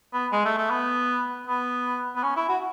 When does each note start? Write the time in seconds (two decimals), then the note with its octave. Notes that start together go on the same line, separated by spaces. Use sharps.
0.13 B3
0.32 G#3
0.45 A3
0.58 A3
0.70 B3
1.47 B3
2.16 B3
2.23 C#4
2.37 E4
2.49 F#4